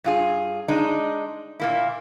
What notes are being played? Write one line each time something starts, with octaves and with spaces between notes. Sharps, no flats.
G2 F4 G#4
G#3 D4 D#4
A#2 A#3 E4